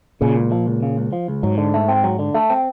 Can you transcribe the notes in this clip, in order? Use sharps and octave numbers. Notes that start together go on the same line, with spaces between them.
A#2 C#3
C#2
F3
C#2
C#3
C#2
F3
C#2
G#2 F#3
D3
A3
C4
F#3
D3
A3
C4